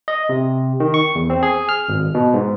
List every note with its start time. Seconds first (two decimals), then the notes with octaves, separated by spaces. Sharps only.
0.08 D#5
0.29 C3
0.80 D#3
0.94 C#6
1.15 E2
1.30 C4
1.43 G#4
1.69 F6
1.89 G#1
2.14 B2
2.34 G#2